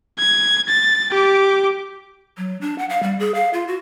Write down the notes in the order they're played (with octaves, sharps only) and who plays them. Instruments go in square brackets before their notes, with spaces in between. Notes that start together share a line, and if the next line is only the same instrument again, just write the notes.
[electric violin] G#6
A6
G4 D6
[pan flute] F#3
D4
F#5
F5
G3
G#4
F5
F4
F#4